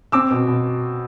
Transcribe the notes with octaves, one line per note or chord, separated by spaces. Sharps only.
C4 D6 E6
B2
B2